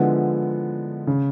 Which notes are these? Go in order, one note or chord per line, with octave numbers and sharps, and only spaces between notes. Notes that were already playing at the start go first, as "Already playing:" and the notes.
Already playing: D3 F3 G#3 B3 E4
C#3